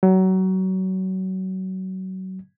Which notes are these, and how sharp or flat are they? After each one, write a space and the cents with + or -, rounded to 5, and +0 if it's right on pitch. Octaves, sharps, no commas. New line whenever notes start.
F#3 +25